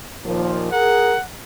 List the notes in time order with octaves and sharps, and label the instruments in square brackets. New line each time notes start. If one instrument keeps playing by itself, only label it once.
[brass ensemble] D#2 A#2 F3
[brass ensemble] G#4 A#4 [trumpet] F#5